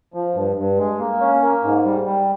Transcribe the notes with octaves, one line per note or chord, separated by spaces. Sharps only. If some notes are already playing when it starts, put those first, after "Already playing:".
F3
G2
G2
G#3
A#3
C#4
A#3
G#2
G3
G3